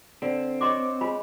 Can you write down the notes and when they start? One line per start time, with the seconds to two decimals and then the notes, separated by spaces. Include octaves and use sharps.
0.22 D3 C4
0.61 F#4 C5 C#5 D#5 C6 D6
1.01 G#3 F4 B5